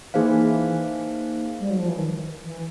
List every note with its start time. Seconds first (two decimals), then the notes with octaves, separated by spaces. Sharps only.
0.14 E3 A#3 D#4 G#4 C5 F5
1.60 G3
1.70 F#3
1.79 F3
1.88 E3
1.97 D#3
2.43 E3